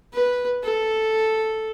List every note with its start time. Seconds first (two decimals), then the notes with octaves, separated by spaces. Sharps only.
0.13 B4
0.63 A4